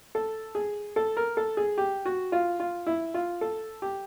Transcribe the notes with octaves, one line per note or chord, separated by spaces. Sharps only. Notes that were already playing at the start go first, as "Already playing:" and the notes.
A4
G#4
A4
A#4
A4
G#4
G4
F#4
F4
F4
E4
F4
A4
G4